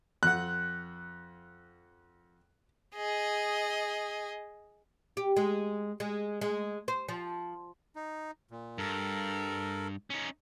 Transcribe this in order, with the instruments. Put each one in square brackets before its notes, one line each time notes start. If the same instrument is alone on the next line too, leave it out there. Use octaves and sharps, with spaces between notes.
[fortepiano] F2 F#5 [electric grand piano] F#6
[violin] G#4 D#5
[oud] G4
G#3
G#3
G#3
C5
F3
[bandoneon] D#4
A#2
[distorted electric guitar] G2 [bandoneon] A4 A#4
[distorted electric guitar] C#4 D#4